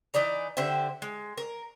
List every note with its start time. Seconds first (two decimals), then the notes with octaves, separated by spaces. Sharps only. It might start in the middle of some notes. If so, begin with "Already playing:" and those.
0.14 E3 D#4 D5 A#5
0.57 D3 G4 C5 E5
1.02 G#3
1.38 A#4